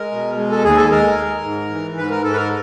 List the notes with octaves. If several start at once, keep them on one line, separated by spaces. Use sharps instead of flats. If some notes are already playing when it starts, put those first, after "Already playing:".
Already playing: G#3 A#4
B2
G#3
A4
D#2 G#4
A4
G#3 A#4
G#3
G#2
E3
G#2 B4
A#4
G#2 A4
B4
A#4